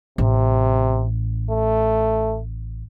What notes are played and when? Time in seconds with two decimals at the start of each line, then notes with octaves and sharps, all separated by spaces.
0.18 A1 C3
1.51 A3